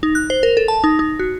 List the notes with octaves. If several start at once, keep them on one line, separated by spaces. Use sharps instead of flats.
D#4
F#6
C5
A#4
A4
A5
D#4
D#4
F#4